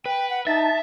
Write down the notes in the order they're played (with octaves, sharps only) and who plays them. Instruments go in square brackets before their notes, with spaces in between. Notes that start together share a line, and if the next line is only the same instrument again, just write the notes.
[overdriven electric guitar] B4 [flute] G5
[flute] F#5
[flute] D#4 [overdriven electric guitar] E5 [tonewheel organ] A5